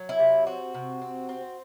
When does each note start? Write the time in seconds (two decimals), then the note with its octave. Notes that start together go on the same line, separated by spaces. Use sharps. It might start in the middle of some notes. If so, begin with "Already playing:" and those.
Already playing: F#3
0.09 E4
0.19 C3
0.47 C4 F#4
0.74 C3
1.01 C4
1.29 C4